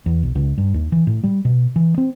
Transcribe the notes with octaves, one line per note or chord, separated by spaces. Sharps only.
E2
B1
C#2
G2
D#2
E3
A2
G3
B2
E3
C4